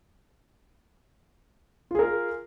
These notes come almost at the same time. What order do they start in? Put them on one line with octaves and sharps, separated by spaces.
F4 G#4 A#4